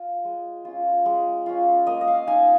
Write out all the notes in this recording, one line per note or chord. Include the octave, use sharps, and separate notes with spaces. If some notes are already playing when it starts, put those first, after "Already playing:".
Already playing: F4
G#3
C#4 F4
G#3
C#4 F4
A#3 D#5
D#5
F5
D#4 G#5